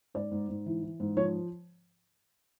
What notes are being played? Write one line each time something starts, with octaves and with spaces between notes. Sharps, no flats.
G#2 D5
G#2
G#2
E3
E3
G#2
F3 C#5